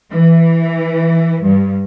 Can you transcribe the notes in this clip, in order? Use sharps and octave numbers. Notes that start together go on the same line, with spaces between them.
E3
G2